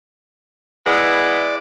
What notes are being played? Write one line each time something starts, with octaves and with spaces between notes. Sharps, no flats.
G#3 B3 E4 D5